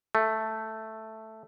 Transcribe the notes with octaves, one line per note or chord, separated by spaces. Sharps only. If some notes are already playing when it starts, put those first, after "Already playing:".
A3